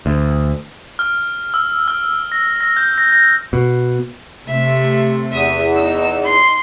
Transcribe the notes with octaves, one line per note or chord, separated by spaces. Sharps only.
D2
F6
E6
F6
A#6
A#6
G6
A#6
A#6
B2
C3 A3 E5
E2 E5 D#6
D#4 E6
C6